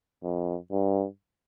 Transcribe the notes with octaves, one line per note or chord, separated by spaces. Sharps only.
F2
G2